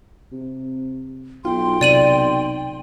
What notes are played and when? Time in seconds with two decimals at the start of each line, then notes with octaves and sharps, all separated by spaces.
0.32 C3
1.45 B1 F4 G5 C6
1.81 C3 D5 D#7 F#7